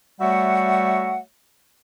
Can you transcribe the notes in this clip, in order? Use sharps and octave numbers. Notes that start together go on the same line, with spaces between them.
G3 A3 F#4 C#5 E5 F#5